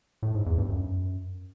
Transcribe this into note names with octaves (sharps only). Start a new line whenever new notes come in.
A2
G#2
E2
G2
F#2